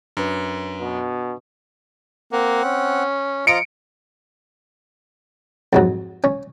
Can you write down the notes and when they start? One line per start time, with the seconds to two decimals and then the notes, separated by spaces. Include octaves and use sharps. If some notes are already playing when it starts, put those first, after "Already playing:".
0.17 F#2 D4 B4
0.81 B2
2.32 A#3 C4 F#5
2.64 C#4
3.47 F3 F4 D#5 A#5 C#7 D7
5.73 F2 G#2 F#3
6.24 C#4